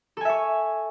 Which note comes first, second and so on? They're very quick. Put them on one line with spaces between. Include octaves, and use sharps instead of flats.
A4 G#5 E5 C#5